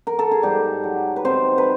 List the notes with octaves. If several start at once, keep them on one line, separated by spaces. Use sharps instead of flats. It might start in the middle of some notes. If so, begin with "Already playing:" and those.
A#4
A4
G#4
G#2 G3 G4
F#3
B4
D#3 C4 C5
B4